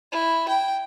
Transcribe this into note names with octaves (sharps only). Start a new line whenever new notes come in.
E4
G5